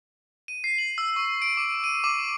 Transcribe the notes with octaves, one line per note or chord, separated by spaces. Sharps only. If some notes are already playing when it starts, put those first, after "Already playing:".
D#7
C7
F#7
E6
C#6
D7
D6
D#7
D6